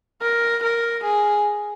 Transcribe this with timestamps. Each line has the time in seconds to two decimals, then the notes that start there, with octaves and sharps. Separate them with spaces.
0.22 A#4
0.63 A#4
1.03 G#4